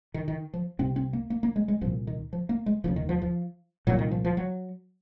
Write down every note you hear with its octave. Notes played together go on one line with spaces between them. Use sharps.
D#3
D#3
F3
C2 C3 C4
C4
A#3
A#3
A#3
G#3
G#3
C2 A#2 F3
D#3
F3
A#3
G#3
F1 D#2 C#3 F3
D#3
F3
F3
C2 A#2 F#3
D#3
F3
F3
F#3